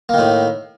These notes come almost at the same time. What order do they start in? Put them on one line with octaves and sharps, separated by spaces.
A#3 D#3 A2